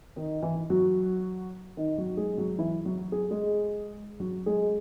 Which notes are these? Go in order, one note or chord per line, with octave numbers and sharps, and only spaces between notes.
D#3 D#4
E3 E4
F#3 F#4
D#3 D#4
F#3 F#4
G#3 G#4
F#3 F#4
E3 E4
F#3 F#4
G#4
G#3 G#4
F#3 F#4
G#3 G#4